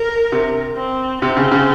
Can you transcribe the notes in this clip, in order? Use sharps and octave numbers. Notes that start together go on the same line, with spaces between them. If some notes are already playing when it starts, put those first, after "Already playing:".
Already playing: A#4
C3
C4
C3 C4
C#3
C#3